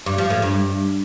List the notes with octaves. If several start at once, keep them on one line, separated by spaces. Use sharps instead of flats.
G2
F3
A2
G2